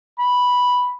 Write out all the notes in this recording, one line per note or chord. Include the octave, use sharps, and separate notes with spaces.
B5